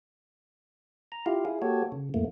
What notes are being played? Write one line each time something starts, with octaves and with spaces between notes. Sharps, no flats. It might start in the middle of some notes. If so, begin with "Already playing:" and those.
A#5
E4 F4 G4 F5
E4 G#4
A#3 F#4 G4 A4 C#5
C#3
F2 A2 A3 A#3